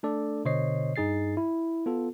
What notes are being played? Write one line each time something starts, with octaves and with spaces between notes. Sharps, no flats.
A3 D4 A4 D5
B2 D3 C5 C#5 D#5 C7
G2 D#4 G#4 A6 C7
E4
B3 F4 A4